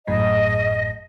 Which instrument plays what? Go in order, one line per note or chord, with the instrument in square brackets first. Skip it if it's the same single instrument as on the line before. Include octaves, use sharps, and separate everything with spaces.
[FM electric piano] G#1 F#2 A2 [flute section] D#5